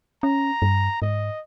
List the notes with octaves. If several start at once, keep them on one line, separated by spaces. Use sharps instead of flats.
C#4 A#5
G2
G#2 D#5